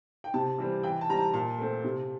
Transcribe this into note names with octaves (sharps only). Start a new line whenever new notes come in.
G5
C3 A5
E3 G3 C4
E3 G5
A5
G3 C4 A#5
A5
A#2 A5
A3 C4
C3